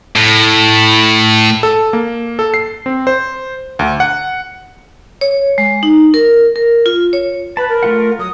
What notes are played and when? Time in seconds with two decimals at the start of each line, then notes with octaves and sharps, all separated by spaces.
0.16 A2
1.63 A4
1.93 A#3
2.39 A4
2.54 C7
2.86 C4
3.07 C5
3.79 D2
4.00 F#5
5.21 C#5
5.58 G#3
5.83 D#4
6.14 A#4
6.56 A#4
6.86 F4
7.13 C#5
7.57 B4 A5 B5
7.69 A#4
7.83 A3 F4 F#5
8.19 F#3 D#6